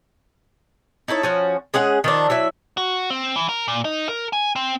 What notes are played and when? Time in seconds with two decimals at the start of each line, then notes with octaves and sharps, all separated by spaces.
1.08 D#4 E4 A4 C#5
1.23 F3 C#4 F#4
1.74 G#3 C#4 G#4 F#5
2.04 D#3 F3 D4
2.30 F#3 E4 E5
2.77 F#4
3.10 C4
3.36 E3
3.49 A#4
3.68 A#2
3.85 D#4
4.09 A#4
4.33 G#5
4.56 C4